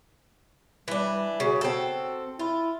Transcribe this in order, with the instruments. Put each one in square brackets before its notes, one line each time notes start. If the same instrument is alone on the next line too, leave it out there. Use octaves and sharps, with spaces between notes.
[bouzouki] E3 D4 [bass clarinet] G3
[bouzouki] C#3 [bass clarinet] F#4
[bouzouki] C4 A4
[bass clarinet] E4 [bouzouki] F4